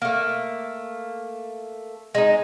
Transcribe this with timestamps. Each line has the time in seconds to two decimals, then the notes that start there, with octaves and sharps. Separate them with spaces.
0.02 A3 A#3
2.15 G#3 D#4